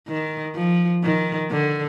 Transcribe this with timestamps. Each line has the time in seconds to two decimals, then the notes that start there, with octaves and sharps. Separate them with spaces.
0.08 D#3
0.55 F3
1.04 D#3
1.51 D3